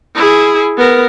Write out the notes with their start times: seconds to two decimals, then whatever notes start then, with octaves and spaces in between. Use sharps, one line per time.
0.16 E4 G#4
0.77 B3 A#4